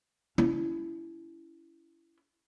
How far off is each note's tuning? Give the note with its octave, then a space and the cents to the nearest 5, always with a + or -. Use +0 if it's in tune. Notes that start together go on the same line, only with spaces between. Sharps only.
C#4 +45 E4 +15